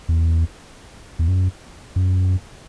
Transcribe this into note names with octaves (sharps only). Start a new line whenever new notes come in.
E2
E2
F#2
F#2